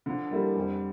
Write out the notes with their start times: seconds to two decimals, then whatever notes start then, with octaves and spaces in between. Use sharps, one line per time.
0.06 D3 F3
0.31 G3 A#3 E4 A4
0.56 F2 G3